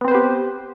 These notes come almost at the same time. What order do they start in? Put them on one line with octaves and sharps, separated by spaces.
B3 C4 C5 B4 G4